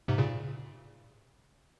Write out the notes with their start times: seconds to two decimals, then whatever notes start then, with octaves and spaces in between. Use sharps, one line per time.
0.08 G#2 C3
0.18 A#2 C#3